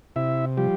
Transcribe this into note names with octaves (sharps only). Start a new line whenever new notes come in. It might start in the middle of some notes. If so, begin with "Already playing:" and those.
C3 E4 E5
F3 G3 G4